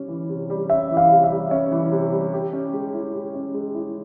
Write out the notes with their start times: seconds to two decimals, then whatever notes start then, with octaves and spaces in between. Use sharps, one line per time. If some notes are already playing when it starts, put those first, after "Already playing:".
Already playing: C3 G3 C#4
0.08 E3
0.29 C3
0.50 G3
0.70 C#4 E5
0.91 E3
0.97 F5
1.11 C3
1.24 E5
1.31 G3
1.51 C#4 E5
1.72 E3
1.91 C3
2.12 G3
2.33 G4
2.53 C#4
2.73 G#3
2.94 E4
3.13 G4
3.35 C#4
3.54 G#3
3.75 E4